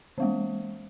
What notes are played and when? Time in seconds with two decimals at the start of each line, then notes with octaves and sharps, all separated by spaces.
0.18 E3 G#3 A#3